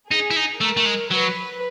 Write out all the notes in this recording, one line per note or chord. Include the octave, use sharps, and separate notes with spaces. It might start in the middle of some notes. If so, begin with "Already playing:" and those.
D#4 G#4
E4
D#4
A3 A#4
A3
G#3
F#3 B4